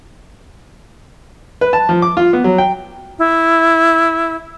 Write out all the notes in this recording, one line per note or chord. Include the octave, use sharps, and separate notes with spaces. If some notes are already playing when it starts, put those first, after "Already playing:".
B4
A5
F3
D6
F4
B3
F#3
G5
E4